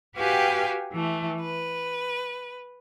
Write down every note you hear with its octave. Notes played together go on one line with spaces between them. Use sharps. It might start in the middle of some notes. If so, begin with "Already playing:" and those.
F#4 G4 B4 F5 G5 G#5
E3 A3
B4